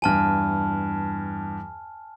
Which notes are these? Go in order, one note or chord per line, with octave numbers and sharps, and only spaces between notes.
E2 G2 G#5 A5 F6